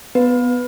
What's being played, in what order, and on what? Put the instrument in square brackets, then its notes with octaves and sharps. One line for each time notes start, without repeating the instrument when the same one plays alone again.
[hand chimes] B3 B4